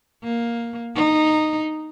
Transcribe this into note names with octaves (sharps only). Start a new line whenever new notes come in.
A#3
D#4